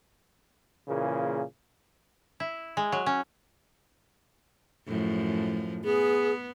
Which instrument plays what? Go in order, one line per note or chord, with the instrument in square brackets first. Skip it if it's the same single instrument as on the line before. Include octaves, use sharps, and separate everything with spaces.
[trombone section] A#2 C#3 E3 A#3 G#4
[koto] E4
G#3
F#3
C#4
[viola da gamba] F#2 A2 F3
[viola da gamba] B3 [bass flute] G#4